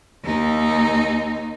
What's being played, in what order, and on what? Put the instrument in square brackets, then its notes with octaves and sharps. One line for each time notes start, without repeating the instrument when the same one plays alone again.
[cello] D#2 D#4